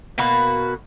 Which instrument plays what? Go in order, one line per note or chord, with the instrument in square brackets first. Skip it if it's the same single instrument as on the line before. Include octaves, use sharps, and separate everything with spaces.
[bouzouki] B2 A#3 F#4 B4